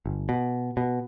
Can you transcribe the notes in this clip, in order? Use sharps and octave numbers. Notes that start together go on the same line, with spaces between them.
G1
B2
B2